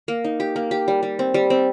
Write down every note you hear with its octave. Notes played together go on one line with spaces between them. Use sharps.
A#3
D#4
G4
A#3
G4
G3
G3
C4
G3
C4